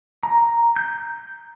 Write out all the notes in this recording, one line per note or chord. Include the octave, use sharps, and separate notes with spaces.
A#5
G6